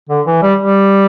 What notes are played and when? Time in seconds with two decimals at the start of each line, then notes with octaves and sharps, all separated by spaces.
0.09 D3
0.26 E3
0.42 G3
0.59 G3